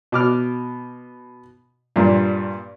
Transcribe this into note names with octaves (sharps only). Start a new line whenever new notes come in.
B2 D6 F6
G2 A#2